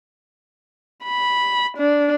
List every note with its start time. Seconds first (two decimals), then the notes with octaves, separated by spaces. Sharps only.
1.04 B5
1.78 D4